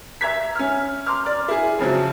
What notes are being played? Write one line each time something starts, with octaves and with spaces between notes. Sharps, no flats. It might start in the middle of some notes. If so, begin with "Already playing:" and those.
E5 A#5 G#6 B6
C#4 F6
A#5 C6 D6 F6
D5
E4 G#4
F2 C#3 F3 F#3